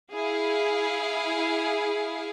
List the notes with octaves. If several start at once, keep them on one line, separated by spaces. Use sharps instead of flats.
E4 G#4 F5